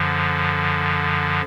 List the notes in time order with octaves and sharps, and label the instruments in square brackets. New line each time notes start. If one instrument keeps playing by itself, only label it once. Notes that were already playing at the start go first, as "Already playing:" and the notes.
Already playing: [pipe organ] F#2 D3 F3